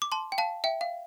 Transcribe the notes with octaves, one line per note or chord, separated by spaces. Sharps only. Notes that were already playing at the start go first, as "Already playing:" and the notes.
D6
A5 C6
G5
F5 A5
E5 G5
F5